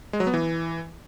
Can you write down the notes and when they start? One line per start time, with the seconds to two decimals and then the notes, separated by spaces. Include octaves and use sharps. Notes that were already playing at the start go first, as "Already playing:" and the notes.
0.13 G#3
0.20 F#3
0.27 B3
0.34 E3